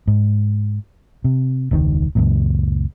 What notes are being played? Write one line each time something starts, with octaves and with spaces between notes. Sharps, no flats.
G#2
C3
E1 C#2 B2 D#3
C#2 F#2 A#2